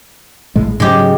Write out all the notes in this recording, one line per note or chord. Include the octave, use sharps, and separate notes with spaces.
A#1 A2 G#3
G#2 C#3 F#3 G#3 G4